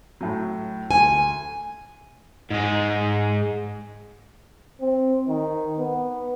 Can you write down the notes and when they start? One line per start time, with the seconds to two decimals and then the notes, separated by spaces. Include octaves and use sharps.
0.21 A2 F#3
0.91 D2 G#5
2.51 G#2 G#3
4.81 C4
5.29 D#3
5.78 B3